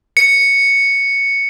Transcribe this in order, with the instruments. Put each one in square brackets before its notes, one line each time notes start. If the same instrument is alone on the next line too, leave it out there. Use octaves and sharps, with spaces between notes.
[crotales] C#7